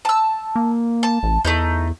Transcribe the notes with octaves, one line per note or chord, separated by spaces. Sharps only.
A5 E6
A#3
A5
A1
E2 A3 D#4 G6